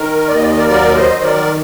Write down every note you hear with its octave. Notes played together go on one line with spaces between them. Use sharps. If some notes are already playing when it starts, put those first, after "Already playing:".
Already playing: D#3 A#4
D#2 D5
D#5
D5
D#5
A#4 D5
F#3 A#4 D5
C5 D#5
D#3
A#4 D5